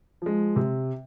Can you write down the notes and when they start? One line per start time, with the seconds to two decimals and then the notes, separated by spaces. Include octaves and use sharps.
0.22 F3 G#3
0.56 C3